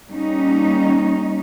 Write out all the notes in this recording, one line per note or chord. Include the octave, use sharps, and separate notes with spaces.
G3 A#3 C#4 D#4